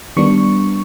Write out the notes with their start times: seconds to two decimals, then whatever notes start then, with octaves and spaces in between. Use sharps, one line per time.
0.17 D#3 G3 B3 D4 C#6